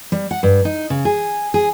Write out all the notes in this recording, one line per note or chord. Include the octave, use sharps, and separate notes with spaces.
G3
F#5
G2
D#4
C#3
G#4
G#4